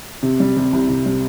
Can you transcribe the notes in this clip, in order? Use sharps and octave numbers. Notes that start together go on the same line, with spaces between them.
C3
G3
C3
C2
C3
G3